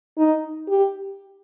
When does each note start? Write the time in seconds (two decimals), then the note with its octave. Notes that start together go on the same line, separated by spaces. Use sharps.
0.18 D#4
0.69 G4